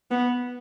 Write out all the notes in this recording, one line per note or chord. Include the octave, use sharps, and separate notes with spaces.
B3